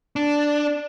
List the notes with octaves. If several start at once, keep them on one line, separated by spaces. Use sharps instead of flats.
D4